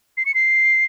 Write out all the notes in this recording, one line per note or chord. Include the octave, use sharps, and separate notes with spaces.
C7
C#7
C7